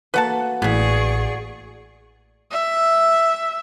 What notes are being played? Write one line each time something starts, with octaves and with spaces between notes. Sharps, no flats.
A#3 F#4 A4 B4 F#5 A5
A1 A2 B3 E4 G#4 D5 C#6
E5